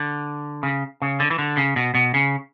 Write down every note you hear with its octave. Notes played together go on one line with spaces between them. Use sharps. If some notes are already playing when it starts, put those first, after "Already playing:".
Already playing: D3
C#3
C#3
D3
E3
D3
C#3
B2
B2
C#3